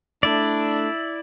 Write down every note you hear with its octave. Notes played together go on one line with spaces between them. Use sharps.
A3 D4 E4 D5